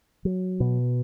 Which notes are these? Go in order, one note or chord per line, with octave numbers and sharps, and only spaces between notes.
F#3
B2